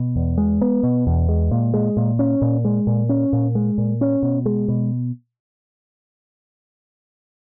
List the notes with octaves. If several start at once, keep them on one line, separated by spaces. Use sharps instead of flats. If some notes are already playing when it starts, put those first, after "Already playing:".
Already playing: B2
E2
G#3
B3
B2
E2
G#3
A#2
G#3
A#2
C#4
A#2
G#3
A#2
C#4
A#2
G#3
A#2
C#4
B2
G#3
B2